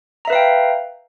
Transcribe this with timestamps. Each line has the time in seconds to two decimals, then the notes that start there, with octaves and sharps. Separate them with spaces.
0.25 A#5
0.28 E5
0.30 B4
0.33 F5
0.35 G5